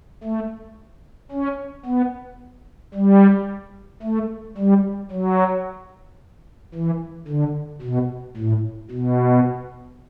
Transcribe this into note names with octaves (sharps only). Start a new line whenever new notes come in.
A3
C#4
B3
G3
A3
G3
F#3
E3
D3
B2
A2
B2